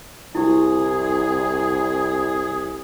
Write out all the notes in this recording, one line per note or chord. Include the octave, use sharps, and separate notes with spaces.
C2 E4 G4 G#4